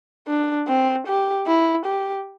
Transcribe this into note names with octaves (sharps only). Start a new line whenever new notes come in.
D4
C4
G4
E4
G4